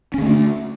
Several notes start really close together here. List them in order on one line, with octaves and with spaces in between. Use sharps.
C#4 D3 A3 D4